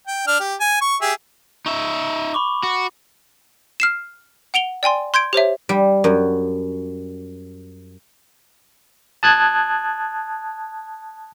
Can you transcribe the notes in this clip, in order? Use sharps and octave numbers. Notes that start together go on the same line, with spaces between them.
G5
D4 F6
G4
G#5
C#6
G4 G#4 E5
D#4 E5 C#6
B5 C#6 D6
F#4
F6 C7 E7
F#5 D7 F7 G7
D5 G5 G#5 C6
C6 G6 G#6 D7
G4 C5 C#5 E5
G3
F#2
A5 D#6 F#6 G#6